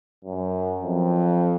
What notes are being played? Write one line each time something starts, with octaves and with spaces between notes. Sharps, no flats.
F#2
F2